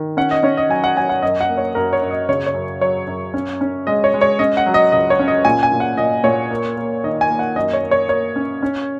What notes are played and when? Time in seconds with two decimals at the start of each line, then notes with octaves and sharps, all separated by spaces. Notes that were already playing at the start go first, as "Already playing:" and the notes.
Already playing: D#3
0.17 C#4 F#5
0.31 D#5
0.43 C#4 C#5
0.57 D#5
0.69 F#3 G#5
0.84 F#5
0.96 F#3 G#5
1.09 F#5
1.22 F#2 D#5
1.41 F#5
1.49 A#3
1.58 C#5
1.75 F#2 A#4
1.93 C#5
2.01 F#2
2.11 D#5
2.29 C#3 C#5
2.46 C#5
2.54 F#2
2.81 F#3 C#5
3.07 F#2
3.34 C#4
3.61 C#4
3.87 G#3 D#5
4.04 C#5
4.14 G#3
4.21 C#5
4.39 C#4 D#5
4.57 F#5
4.66 F#3
4.74 D#5
4.92 C#2 D#5
5.10 C#5
5.19 C#4
5.28 D#5
5.45 A#2 G#5
5.63 G#5
5.72 A#2
5.80 F#5
5.97 A#2 D#5
6.24 A#2 C#5
6.51 A#3
6.77 A#3
7.04 D#3 D#5
7.21 G#5
7.30 A#3
7.39 F#5
7.56 F#2 D#5
7.73 C#5
7.83 A#3
7.91 C#5
8.09 A#3 C#5
8.36 C#4
8.63 C#4